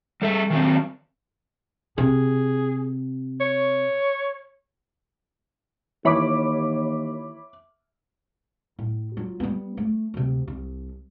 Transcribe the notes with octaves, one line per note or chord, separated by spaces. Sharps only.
G3 A4 E5
D#3 F#3 C4
C3 G#4
C#5
D#2 E3 C#5 E5 B5 D6
A2
F#3 F4
G3 B3
A3
D2 C3
C2